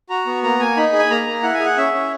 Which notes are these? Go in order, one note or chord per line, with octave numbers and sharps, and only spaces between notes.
F#4 A#5
B3
A#3 A#5
A#3 G#5
D#4 B5
G#4
G#5
A#3 A#5
A#3
E4 F#5
G#5
G#4
F#5
C#4 E5
C#4